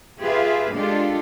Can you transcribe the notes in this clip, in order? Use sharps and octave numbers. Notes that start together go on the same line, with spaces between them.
F4 G4 G#4 B4 E5 F5
G#3 D4 F4 G4 A4